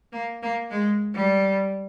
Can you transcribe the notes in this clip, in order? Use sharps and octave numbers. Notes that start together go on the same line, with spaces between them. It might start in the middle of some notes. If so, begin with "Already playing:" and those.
A#3
A#3
G#3
G3